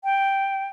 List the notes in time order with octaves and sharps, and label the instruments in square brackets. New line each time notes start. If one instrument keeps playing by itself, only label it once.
[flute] G5